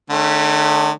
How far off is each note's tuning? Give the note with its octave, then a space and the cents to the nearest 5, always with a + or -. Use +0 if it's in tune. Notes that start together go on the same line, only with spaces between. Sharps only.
D3 +45 A3 -20 C#4 +5